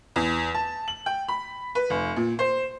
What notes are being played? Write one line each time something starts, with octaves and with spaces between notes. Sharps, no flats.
E2
A5
F#7
G5
B5
B4
F1
A#2
C5